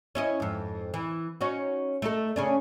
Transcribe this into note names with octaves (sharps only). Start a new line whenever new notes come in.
C#4 E4 D#5
F2 G#2
E3
C#4 D#4 F#4
A3 D#4 A4
C#3 C#4 D4